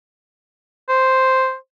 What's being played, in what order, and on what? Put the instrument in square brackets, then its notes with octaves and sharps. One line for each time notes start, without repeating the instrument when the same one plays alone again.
[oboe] C5